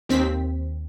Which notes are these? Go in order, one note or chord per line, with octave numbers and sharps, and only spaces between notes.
D#2 C4 B6